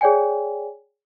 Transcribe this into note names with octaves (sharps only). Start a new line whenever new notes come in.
G#4 C#5 D5 G5 G#5